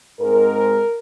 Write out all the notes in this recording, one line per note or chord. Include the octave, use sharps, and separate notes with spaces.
G#2 G#3 C4 A#4